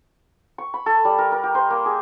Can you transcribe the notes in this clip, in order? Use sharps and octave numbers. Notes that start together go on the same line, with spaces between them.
C#6
B5
A4
G3
A#4
A#4
G4
C5
A#3
G#4